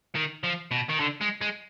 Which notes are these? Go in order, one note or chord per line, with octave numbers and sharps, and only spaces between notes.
D#3
F3
B2
D#3
D3
G#3
G#3